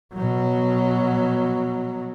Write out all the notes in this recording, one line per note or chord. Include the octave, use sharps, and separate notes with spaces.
B2 F#3